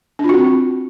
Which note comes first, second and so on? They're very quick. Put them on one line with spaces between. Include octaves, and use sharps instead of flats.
D4 F4 F#4 C4